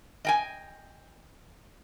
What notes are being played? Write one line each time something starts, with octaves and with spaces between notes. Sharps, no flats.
D#5 G5 G#5